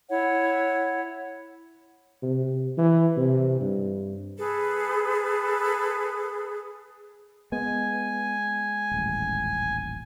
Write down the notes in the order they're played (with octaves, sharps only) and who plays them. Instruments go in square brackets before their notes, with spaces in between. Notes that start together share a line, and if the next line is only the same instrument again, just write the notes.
[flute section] E4 C#5 F#5
[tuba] C3
E3
C3
G2
[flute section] G#4 A4 B4
[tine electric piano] G#3 [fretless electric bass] B3 [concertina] G#5
[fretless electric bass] D#1 A1